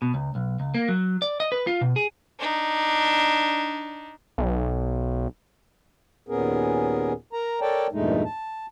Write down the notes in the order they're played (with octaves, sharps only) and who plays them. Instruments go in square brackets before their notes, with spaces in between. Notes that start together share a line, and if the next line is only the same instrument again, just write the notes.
[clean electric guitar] B2
C#2
B1
C#2
A#3
F#3
D5
D#5
B4
F4
B2
G#4
[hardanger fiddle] D4 D#4
[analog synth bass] B1
[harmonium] D#2 A#2 B3 C#4 G#4 A#4
A#4 A#5
A4 A#4 C#5 D5 G5 A5
E2 G2 A#2 G#3 A3 D#4
A5